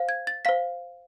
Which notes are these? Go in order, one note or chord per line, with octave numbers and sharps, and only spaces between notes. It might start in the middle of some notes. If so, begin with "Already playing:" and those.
Already playing: C5 F5
G#6
A6
C5 F5 B6